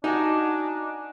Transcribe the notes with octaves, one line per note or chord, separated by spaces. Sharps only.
D4 D#4 F#4 G#5